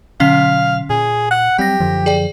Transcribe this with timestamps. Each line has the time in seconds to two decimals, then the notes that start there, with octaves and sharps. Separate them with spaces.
0.20 B2 D3 F#3 C#4 F5 C7
0.90 A#2 G#4
1.31 F#5 F#6
1.58 F#3 G3 C4 G4 G5 A#6
1.80 F#2 D3 F3
2.06 G#4 D5 G5